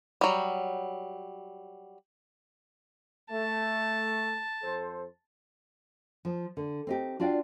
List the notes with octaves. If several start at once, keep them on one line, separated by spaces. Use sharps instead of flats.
F#3 G3
A3 A5
F2 A4 C5
F3
D3
C4 D#4 G4
D4 F4 F#4 D5 F5 G5